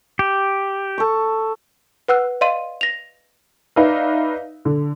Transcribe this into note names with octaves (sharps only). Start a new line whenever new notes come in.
G4
A4 C#6
B4 F#5 E6 F#6
D5 D#5 F5 C6 D#7
A#6 F7
D#4 B4 D5 E5 F5
D3